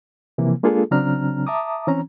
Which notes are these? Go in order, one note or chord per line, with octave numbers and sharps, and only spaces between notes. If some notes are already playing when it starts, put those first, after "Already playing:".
C3 E3 F3 A#3
G#3 A#3 D4 F4 G#4 A4
C#3 F#3 C4 D4 A#5 F6
E5 A5 A#5 D6 D#6
E3 C4 C#4 A#5